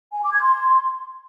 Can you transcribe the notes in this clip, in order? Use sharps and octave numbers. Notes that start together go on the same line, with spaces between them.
G#5
D6
G#6
C6